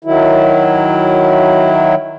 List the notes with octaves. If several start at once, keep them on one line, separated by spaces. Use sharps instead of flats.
D#3 F#3 E4